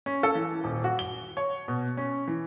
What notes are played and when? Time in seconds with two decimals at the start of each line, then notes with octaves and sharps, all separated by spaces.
0.06 C#4
0.23 A4
0.35 E3
0.64 D#1
0.84 F#4
0.99 G7
1.37 C#5
1.68 B2
1.97 C#4
2.28 E3